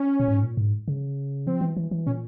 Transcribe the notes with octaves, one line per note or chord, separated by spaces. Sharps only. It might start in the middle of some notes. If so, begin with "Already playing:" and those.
Already playing: C#4
A#2
G#2
A#2
G#2
C#3
F3 C4
E3
E3
E3
A#2 C#4